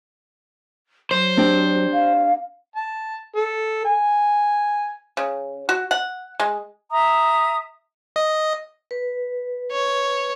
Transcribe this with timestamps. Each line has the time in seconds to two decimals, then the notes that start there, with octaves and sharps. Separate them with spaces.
1.11 F#3 C5
1.37 C4 D4 G4
1.92 F5
2.76 A5
3.36 A4
3.85 G#5
5.17 C#3
5.69 F#4
5.91 F#5
6.40 G#3
6.91 E5 A#5 D#6
8.16 D#5
8.91 B4
9.71 C#5